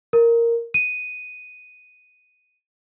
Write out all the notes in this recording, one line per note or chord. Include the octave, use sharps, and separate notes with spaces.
A#4
D#7